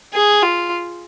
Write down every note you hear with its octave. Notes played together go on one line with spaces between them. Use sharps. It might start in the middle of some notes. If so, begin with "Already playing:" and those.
G#4
F4